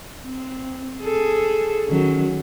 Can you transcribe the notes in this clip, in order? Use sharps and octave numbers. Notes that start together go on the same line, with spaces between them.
C4
G#4 A4
D#3 F#3 C#4